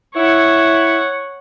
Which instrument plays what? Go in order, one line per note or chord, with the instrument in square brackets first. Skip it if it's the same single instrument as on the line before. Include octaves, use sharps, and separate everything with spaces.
[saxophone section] E4 [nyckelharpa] C#5 F#5